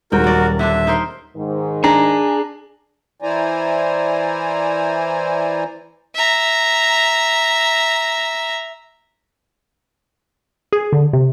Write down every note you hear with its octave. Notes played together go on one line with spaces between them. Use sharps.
D#1 G#2 F#4 A#4 G5
F#3 D5
D3 C4 D4 E5
D#4 A#4 C5
G#2 D#3
D4 G#4 A#5
E3 E4 C5 D5 G#5 A#5
E5 A#5
G#4
D3
C3